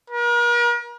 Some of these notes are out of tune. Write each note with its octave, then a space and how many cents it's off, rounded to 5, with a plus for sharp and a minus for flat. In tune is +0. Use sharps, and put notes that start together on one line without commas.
A#4 +45